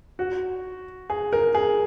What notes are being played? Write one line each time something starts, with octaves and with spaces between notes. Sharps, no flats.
F#4
G#4
A#4
G#4